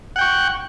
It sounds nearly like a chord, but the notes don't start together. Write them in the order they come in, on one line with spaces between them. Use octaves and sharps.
F#5 G5 C#6